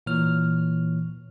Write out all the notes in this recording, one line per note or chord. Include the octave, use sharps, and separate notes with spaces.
A#2 E3 C#5 F6